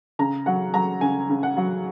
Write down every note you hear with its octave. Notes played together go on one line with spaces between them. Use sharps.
C#3 A#5
F#3 F#5
F#3 A#5
C#3 G#5
C#3
F#5
F#3